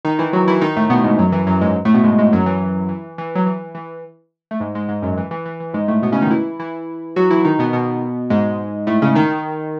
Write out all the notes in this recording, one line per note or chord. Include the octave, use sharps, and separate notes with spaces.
D#3 D#4
E3 E4
F#3 F#4
E3 E4
D#3 D#4
A2 A3
B2 B3
G#2 G#3
F#2 F#3
E3
F#2 F#3
G#2 G#3
A2 A3
B2 B3
G#2 G#3
G#2 G#3
F#2 F#3
E3
E3
E3
F#3
E3
E3
A3
G#2 G#3
G#2 G#3
G#2 G#3
F#2 F#3
E3
E3
E3
E3
G#2 G#3
A2 A3
B2 B3
C#3 C#4
D#3 D#4
E3 E4
E3 E4
F#3 F#4
E3 E4
D#3 D#4
B2 B3
B2 B3
G#2 G#3
A2 A3
C#3 C#4
D#3 D#4